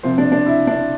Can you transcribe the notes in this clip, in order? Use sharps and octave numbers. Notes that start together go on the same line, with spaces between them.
C3 F3 C5
D4
D4
E4
D4